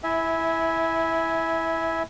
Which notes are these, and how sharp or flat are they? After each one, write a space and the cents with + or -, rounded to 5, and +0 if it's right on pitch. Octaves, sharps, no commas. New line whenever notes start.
E4 +0 E5 -15 G#5 +0